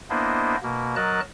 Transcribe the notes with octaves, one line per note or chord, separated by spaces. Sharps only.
A#3 B3 D4 E4 C5 D#5
B2 A#3
F#3 A#4 D#5 A5 F#6